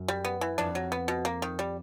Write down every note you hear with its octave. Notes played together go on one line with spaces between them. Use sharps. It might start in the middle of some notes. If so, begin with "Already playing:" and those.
Already playing: F#2
G3
B3
E3
F2 D4
F#3
B3
B2
A#3
D#3
G3